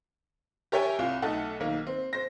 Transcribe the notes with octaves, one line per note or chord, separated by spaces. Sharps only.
G4 A#4 C#5 E5 G5 G#5
C2 F4
B1 A3 D#4 A4 F#5
B1 D#3 A#3
C4
C5 A#6